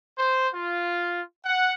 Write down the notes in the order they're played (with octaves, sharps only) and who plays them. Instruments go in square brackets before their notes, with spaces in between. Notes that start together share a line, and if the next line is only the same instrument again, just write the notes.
[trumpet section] C5
F4
F#5